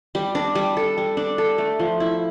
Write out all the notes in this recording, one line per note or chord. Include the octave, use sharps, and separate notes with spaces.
G3
D4
G3
A4
G3
D4
A4
A3
F3
E4